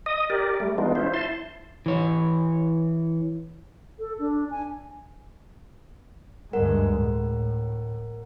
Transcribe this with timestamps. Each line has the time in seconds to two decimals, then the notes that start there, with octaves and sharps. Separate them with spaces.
0.06 D#5 D#6
0.30 G4 A#4 D5
0.60 G3 A3
0.78 E3 G#3 B3 D4 D#4 F4
0.95 C#4 E4 F4 C5
1.13 E4 A5 C6
1.86 E3 C#5
3.99 A4
4.19 D4
4.50 G#5
6.53 D2 G2 G#3 A#4 F#5
6.94 A2